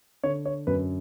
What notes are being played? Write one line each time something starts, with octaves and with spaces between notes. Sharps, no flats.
D3 C#5
C#5
F#2 B4